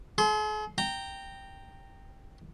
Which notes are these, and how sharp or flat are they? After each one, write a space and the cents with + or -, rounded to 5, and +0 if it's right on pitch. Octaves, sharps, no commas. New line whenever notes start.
G#4 +45 C6 -5
G5 +0 A#5 -15